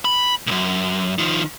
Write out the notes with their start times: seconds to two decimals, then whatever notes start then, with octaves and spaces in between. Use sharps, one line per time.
0.05 B5
0.47 C2 F#2
1.19 D#3 F3